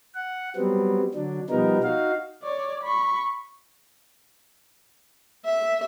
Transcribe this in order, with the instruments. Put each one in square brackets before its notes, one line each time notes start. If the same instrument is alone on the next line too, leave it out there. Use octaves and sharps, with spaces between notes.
[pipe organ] F#5
F#3 G3 B3 C4
D3 F#3 D4
B2 F3 G3 B3 D#4 A#4
D#4 F#4 F5
[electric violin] C#5 D5
B5 C#6
[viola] E5